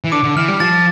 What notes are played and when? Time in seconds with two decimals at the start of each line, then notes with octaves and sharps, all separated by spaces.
0.04 E3
0.12 D3 D6
0.24 D3
0.36 E3 F6
0.48 G3
0.60 F3 A6